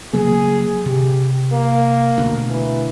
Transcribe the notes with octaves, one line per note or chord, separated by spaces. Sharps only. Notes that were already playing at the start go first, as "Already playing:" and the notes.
C#3 F#3 A#3 G#4
C3 G4
A#3
D2 B2
E3